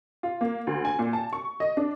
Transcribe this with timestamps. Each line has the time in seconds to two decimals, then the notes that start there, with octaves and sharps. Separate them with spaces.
0.23 F4
0.41 A#3
0.67 D2
0.85 G#5
0.99 A#2
1.13 A5
1.33 C#6
1.60 D#5
1.77 D4